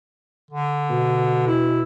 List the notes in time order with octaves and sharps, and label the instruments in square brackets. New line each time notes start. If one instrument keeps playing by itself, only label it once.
[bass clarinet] D3
[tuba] B2
[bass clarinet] E4